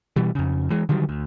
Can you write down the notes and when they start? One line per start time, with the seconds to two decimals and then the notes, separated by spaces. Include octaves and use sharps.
0.16 B2 E3 G3
0.35 F2 C#3
0.70 E3 G#3
0.89 D3 D#3 F#3 G3
1.09 D2